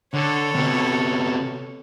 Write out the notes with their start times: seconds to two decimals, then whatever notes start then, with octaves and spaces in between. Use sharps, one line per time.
0.14 D3 A4 C#5
0.55 C3 B3